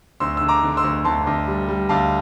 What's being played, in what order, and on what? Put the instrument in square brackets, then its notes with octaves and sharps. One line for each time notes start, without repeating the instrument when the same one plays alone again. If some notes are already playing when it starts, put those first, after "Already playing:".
[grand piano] D2 C6 E6
D3 E6
A#5 D6
D3
C6 E6
D2
D2 A5 C6
D2
G3
G3
D2 F5 A5